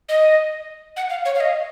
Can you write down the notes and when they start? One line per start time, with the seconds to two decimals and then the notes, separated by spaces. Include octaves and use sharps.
0.09 D#5
0.97 F#5
1.10 F5
1.25 C#5
1.35 F5
1.40 D#5